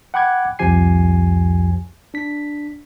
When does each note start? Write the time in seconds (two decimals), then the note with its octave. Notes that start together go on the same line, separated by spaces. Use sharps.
0.14 F#5 G5 B5 D6 F#6 G#6
0.59 C2 F2 F3 G4 G#5 C7
2.14 D4 B6